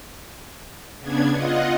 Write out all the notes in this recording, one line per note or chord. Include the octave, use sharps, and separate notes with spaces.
C#3 B3 D4 G#6
F4 D#5 F#5